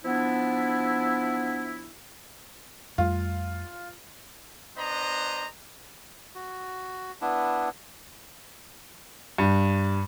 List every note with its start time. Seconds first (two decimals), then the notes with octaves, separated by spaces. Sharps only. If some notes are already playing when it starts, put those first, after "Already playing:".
0.05 F3 B3 D4 E4
2.98 F2 G3 A3 F4
4.78 B3 D4 C5 D#5 A#5
6.35 F#4
7.21 B3 D4 E4
9.38 G2